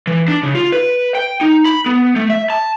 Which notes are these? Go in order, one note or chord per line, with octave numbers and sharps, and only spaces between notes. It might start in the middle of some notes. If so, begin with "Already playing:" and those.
E3
D4
C#3
F4
B4
G5
D#4
B5
B3
A3
E5
A5